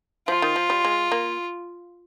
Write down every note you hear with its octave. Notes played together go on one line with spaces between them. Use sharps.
F3 F4
D#3
F3
G3
G#3
A#3